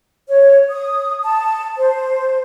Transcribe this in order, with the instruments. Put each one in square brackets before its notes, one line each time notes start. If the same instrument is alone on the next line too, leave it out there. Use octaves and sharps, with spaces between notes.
[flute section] C#5
D#6
A5
C5